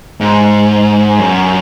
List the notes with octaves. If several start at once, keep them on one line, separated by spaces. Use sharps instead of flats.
G#2
F#2